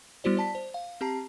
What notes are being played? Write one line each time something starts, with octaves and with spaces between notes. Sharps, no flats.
G3 B3 E4 F#4 C5 D5
D5 A5 B6
C5
F5
C4 G4 A5 A#5 C7